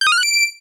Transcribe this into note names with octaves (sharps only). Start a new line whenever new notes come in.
G6
D#6
F6
F#6
D7